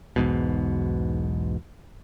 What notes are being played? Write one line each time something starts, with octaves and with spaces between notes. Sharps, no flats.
B1 E2 G#2 B2